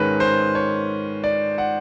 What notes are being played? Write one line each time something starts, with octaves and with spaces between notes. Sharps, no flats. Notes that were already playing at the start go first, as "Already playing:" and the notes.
Already playing: G#2 D#3 G#3 C#4 B4
C5
C#5
D5
F#5